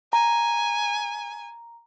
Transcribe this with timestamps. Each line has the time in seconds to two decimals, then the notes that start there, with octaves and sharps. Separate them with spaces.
0.13 G#5 A#5